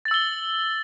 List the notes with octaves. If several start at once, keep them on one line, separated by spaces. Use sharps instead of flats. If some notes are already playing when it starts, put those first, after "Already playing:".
E6 A6 F#7 G7